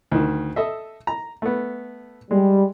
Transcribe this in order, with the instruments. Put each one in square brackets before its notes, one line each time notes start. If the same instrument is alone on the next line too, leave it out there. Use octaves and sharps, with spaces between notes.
[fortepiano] D2 D#3
A4 D#5 E5
A#5
A3 B3
[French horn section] G3 [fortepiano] G#3